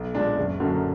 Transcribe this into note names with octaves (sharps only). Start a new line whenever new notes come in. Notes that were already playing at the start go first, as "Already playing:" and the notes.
Already playing: B1
A#2 G#3 D4
F#1
F#2 D3 F#3 A#3